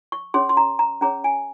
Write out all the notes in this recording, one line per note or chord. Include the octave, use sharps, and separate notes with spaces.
C#6
C#4 G#4 C#5 C6
C6
A#5
A#5
C#4 G#4 C#5 A#5
G#5